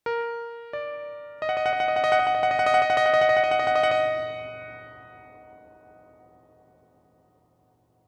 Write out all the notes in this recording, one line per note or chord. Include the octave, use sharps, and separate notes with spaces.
A#4
D5
D#5
F#5
D#5
F#5
D#5
F#5
D#5
F#5
D#5
F#5
D#5
F#5
D#5
F#5
D#5
F#5
D#5
F#5
D#5
F#5
D#5
F#5
D#5
F#5
D#5
F#5
D#5
F#5
D#5
F#5
D#5
F#5
D#5